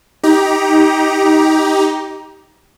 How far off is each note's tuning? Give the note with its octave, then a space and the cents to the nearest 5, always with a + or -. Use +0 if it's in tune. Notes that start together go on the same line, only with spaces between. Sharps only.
D#4 +15 G4 +0 A#5 +20